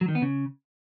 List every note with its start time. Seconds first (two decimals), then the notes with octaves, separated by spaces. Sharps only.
0.01 F#3
0.08 D#3
0.15 B3
0.22 C#3